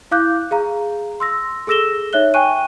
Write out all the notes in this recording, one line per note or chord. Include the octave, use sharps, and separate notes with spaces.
E4 F5 D6 F#6 G6
G#4 F5 A#5
C6 E6 A#6
G#4 A4 E6 A#6 E7 G7
D#4 C#5 E5 F#6 G7
G5 G#5 C#6 F#6 D#7